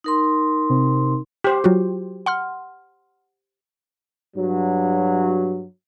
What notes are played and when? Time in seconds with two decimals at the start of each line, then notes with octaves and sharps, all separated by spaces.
0.04 D#4 A#4 C6
0.70 C3
1.44 G4 C5
1.64 F#3 F4 F#4
2.26 F#5 C6 F6
4.35 G2 F#3